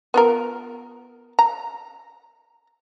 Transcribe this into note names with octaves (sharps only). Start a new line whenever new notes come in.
B3 F4 A#4
A#5